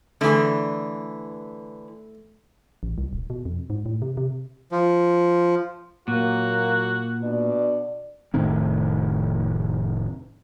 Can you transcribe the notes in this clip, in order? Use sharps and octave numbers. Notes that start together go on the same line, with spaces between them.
D3 E3 A3 G#4
A1
C2
D#1
B2
F2
G#2
A2
C3
C3
F3
A#2 F#3 A#3 F#4
B2 D4 D5
F1 A2 D#3 C4